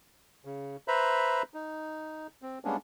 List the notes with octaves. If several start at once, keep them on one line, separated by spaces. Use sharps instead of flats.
C#3
B4 C5 E5 A#5 B5
D#4
C4
G3 G#3 A#3 B3 C#4 D4